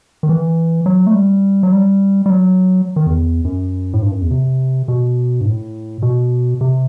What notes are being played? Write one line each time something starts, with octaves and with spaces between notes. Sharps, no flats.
D#3
E3
F#3
A3
G3
F#3
G3
G3
F#3
D#3
E2
F#2
A2
G2
F#2
E2
C3
B2
G2
A2
B2
C3